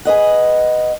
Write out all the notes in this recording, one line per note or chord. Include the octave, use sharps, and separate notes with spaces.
G#4 B4 D#5 F#5